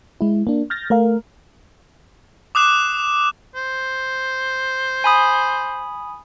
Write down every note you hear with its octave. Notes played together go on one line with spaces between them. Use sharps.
G#3 E4
A#3 D4
F6 G6 A6 A#6
A3 A#4 F5
D6 D#6 F#6 E7
C5
G#5 B5 D#6